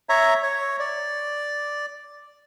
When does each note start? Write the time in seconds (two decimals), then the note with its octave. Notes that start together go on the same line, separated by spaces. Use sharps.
0.09 C#5 E5 A#5
0.43 C#5
0.80 D5